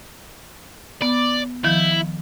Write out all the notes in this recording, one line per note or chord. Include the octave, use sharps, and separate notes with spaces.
B3 D5
D#3 F3 E4 G6